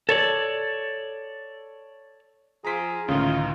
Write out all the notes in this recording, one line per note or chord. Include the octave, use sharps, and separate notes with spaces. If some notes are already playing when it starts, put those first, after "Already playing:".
A4 C#5 D5
F3 C4 F4 G#4 A#5 B6
C#2 A2 D3 D#3 C#4 D#4 F4